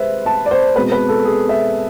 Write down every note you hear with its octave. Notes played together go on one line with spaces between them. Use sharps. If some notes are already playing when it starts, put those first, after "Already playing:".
Already playing: C3 G#3 B4 C5 E5
A5
D5
C5
B2 G#3 C4 B4
B4
A4
G#4
E5